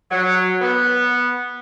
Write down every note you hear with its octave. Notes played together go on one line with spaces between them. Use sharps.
F#3
B3